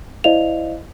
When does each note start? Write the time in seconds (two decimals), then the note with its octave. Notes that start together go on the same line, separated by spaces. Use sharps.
0.24 E4 C5 D5 D#5 F5 F7